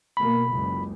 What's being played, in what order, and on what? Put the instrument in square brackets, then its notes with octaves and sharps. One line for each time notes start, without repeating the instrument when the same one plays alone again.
[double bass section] B2 A#3 [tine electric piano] B5
[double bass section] F#1 C#2